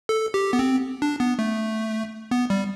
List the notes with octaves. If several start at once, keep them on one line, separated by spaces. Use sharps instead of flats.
A4
G4
B3
C4
D4
B3
A3
B3
G3